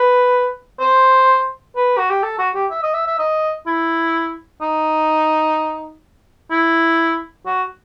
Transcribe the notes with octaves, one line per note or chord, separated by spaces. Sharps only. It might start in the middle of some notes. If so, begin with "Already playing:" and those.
Already playing: B4
C5
B4
F#4
G4
A4
F#4
G4
E5
D#5
E5
E5
D#5
E4
D#4
E4
F#4